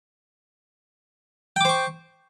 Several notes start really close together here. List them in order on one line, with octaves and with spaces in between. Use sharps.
G5 D6 C5 C#6